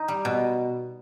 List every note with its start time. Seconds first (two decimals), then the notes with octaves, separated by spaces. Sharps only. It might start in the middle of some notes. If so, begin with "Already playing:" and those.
Already playing: D#4
0.08 G3
0.25 B2